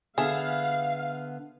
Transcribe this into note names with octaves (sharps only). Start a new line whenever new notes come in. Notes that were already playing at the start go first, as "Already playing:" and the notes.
D3 B3 G#4 E5 F5